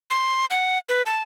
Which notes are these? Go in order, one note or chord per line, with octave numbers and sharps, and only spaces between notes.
C6
F#5
B4
A5